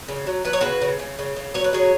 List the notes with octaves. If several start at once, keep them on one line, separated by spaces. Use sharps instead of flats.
C#3
F#3
F#3 B4
C#5
C#3 F#4 B4
C#3
C#3
C#3
C#3
F#3 C#5
B4
F#3 G#4 C#5